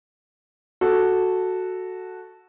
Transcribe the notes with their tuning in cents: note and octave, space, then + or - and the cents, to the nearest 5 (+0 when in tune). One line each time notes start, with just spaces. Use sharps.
F#4 +0 A4 +0